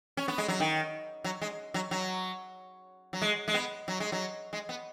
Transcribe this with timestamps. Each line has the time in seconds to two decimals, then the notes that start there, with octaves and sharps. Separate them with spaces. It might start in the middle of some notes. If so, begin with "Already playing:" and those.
0.17 C#4
0.28 B3
0.38 G#3
0.48 F#3
0.60 D#3
1.24 F#3
1.41 G#3
1.74 F#3
1.91 F#3
3.13 F#3
3.22 G#3
3.48 G#3
3.54 B3
3.88 F#3
4.00 G#3
4.12 F#3
4.53 G#3
4.69 B3